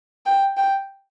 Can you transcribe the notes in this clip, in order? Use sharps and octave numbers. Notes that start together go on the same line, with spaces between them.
G5
G5